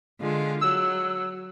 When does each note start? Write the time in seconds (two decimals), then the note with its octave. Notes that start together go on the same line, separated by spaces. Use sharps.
0.20 D3 G#3 F4
0.61 F#3 E6